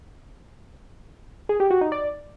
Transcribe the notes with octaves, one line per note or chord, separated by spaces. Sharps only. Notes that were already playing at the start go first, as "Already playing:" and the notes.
G#4
G4
F#4
D#4
D5